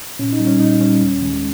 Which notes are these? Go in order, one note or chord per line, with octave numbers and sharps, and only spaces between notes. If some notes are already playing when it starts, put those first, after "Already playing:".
A#2 C#4
D#4
G3
C#4
A#2 D#4
G3 C#4
D#2
D#3 G#3